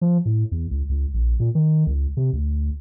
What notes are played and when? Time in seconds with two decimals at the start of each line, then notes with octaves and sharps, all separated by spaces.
0.01 F3
0.25 A2
0.52 E2
0.71 C#2
0.89 C#2
1.14 A#1
1.40 A#2
1.55 D#3
1.87 C#2
2.17 C3
2.33 D2